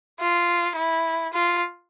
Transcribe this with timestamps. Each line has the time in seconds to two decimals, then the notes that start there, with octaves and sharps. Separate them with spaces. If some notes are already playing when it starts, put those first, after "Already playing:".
0.20 F4
0.76 E4
1.33 F4